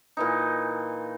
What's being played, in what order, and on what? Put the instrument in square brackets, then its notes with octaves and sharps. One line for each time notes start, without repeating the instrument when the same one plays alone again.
[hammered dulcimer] A#2 E3 D#4